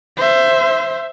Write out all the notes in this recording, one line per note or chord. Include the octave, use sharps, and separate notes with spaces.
C5 E5